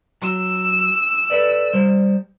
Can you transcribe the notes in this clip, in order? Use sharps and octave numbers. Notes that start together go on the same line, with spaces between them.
F#3 E6
A4 B4 D5
G3 C5